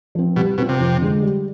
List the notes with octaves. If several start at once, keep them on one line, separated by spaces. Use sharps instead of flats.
F3 C4
B2 G3
B2 C4 F4
C3
F2
D3 G#3
G3